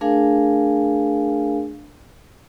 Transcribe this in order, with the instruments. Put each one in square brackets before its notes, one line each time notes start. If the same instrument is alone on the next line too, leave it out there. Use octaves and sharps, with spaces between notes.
[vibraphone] A3 D4 G#4 A#4 F5 G#5